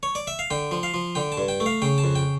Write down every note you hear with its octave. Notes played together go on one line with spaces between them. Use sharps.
C#5
D5
E5
F5
D3 G5
F3
F5
F3
D3 G5
A5
G2
G5
A3
F5
C#3 G5
A5
F2
G5